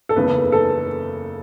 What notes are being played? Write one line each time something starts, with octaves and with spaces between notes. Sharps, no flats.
A4
F#1 E2 C#3 B4
A4